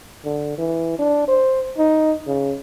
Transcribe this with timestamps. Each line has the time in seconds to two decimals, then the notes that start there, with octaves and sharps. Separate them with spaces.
0.25 D3
0.58 E3
0.99 D4
1.28 C5
1.78 D#4
2.27 C#3